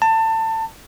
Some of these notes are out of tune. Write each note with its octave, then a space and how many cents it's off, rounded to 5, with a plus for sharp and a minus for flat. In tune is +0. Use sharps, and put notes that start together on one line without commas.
A5 +25